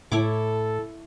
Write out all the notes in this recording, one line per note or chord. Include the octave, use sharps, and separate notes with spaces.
A2 E4 A4 C#5 D6